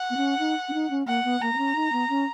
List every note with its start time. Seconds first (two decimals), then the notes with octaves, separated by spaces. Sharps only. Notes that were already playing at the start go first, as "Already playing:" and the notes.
Already playing: F#5
0.10 B3
0.17 C#4
0.39 D#4
0.69 C#4
0.74 D#4
0.90 C#4
1.07 A#3 F#5
1.24 B3
1.42 A#3 A#5
1.53 B3
1.58 C#4
1.76 D#4
1.92 B3
2.09 C#4